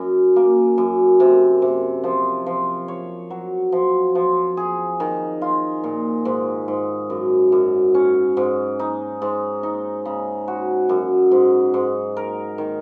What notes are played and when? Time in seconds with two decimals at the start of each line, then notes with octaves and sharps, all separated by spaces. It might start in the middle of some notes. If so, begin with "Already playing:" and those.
Already playing: F#2 C#4
0.36 A#3
0.78 F#2
1.20 C3
1.62 C3
2.04 F3
2.46 F3
2.88 C#5
3.30 F#3
3.72 F3
4.15 F3
4.57 G#4
5.00 D#3
5.42 F4
5.84 A#2
6.25 G#2
6.68 G#2
7.10 F#2
7.52 F#2
7.94 C#4
8.37 G#2
8.79 D#4
9.22 G#2
9.63 D#4
10.05 C#3
10.48 F#4
10.89 F#2
11.31 G#2
11.74 G#2
12.17 A#4
12.58 D#3